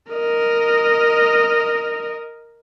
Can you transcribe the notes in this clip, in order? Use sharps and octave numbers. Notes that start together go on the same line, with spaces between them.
A#4 D#5